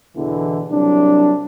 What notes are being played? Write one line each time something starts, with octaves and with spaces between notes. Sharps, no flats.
E2 B2 D3 E3
C2 F#3 D4